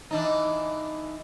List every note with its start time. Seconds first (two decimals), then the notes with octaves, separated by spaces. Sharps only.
0.11 E3 D4 D#4